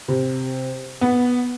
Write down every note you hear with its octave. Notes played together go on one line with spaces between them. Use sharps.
C3
B3